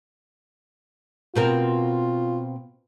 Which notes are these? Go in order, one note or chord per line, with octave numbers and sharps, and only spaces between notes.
B2 C4 F4 A#4